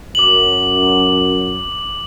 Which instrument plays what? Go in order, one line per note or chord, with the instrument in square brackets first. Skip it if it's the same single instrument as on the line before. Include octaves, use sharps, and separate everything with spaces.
[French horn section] F#2 [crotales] D6 F#7